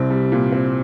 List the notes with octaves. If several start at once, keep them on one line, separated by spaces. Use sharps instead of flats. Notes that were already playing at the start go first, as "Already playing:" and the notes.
Already playing: C2 C3 C4
G3
A#2
C4